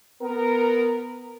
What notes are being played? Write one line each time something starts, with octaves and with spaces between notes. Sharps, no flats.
B3 A#4